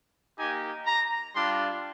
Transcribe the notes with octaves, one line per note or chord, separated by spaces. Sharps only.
A#3 D#4 G4 G#5
A#5
G3 D4 F4 C6